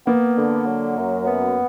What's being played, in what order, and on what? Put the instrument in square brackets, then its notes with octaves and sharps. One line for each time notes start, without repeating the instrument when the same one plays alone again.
[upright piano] A#3 [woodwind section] B3
[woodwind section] D3
F#3
F#2
B3